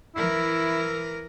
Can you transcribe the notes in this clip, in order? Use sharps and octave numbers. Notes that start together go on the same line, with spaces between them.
E3 E4 A#4